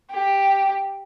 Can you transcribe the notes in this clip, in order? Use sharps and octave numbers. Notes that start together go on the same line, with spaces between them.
G4